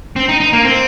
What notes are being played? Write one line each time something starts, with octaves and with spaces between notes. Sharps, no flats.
C4
D#4
D#4
A#3
C4